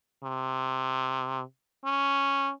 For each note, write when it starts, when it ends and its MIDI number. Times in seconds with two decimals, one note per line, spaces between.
0.23 1.42 48
1.84 2.51 61